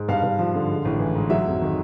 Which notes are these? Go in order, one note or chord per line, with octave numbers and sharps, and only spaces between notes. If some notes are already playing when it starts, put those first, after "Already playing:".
Already playing: G#2
G2 F5
G2
F3
D3
G#3
A1
E3
G#2
F#3 E5
F2
D#3